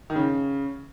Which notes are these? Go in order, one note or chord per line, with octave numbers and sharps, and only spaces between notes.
D#3
C#3